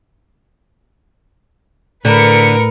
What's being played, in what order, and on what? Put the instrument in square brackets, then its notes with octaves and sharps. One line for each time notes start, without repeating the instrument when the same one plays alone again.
[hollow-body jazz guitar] A2 [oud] D3 [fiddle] A#4 [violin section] B4 C#7